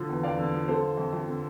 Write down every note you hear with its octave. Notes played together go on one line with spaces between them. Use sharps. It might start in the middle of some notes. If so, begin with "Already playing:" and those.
Already playing: D3 F3
E2
E2 D5 F5
D3
F3
D3 A4 C5
F3
F2
F2
D3